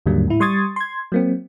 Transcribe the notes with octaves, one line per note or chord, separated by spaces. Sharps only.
D#2 G#2 D3 F#3 G3 A#3
A2 E4
G3 C6 C#6 D#6 G#6 A6
C6 G#6
F#3 A#3 C4